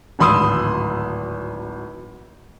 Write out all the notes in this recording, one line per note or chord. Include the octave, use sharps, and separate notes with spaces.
D1 G#1 B5 C6 D#6 E6